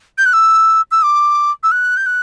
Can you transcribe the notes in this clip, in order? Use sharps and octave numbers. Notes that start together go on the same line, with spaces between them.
G6
F#6
E6
E6
D6
E6
F#6
G6
F#6